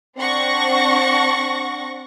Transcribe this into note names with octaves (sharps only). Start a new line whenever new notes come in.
C4 D4 F#5 C#6 A#6